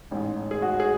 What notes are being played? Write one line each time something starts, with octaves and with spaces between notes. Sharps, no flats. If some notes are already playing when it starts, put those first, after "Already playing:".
A1 G#2
G#4
F#4
G#4